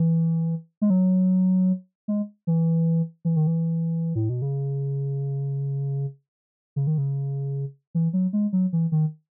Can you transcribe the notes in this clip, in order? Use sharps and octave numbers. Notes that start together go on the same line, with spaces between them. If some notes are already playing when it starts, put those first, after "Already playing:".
Already playing: E3
G#3
F#3
G#3
E3
E3
D#3
E3
A2
B2
C#3
C#3
D#3
C#3
E3
F#3
G#3
F#3
E3
D#3